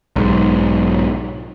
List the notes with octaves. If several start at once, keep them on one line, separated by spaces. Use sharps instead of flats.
B1 G#2